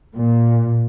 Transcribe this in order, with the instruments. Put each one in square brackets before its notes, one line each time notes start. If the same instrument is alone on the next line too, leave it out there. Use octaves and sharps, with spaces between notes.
[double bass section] A#2